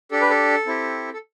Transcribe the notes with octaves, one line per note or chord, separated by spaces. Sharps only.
D4 G4 A4
B4
A4
C4 E4 G4
A4